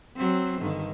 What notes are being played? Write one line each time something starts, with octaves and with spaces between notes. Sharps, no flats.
F#3 C4
G2 D3 D#3